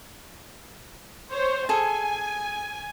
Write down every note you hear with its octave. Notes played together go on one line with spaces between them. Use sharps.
C5 C#5
G#4 A4 G#5